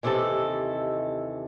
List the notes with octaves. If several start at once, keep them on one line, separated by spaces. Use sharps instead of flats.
D#2 C3 E3 A3 A4 D#5